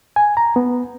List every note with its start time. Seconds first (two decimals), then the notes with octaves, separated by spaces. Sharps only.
0.16 G#5
0.37 A#5
0.56 B3